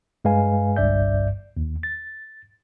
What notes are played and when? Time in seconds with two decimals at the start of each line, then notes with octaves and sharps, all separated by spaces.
0.25 G2 G#3 B4 F5 G#5
0.76 G1 C2 G2 D5 E5 G6
1.57 D#2
1.83 A6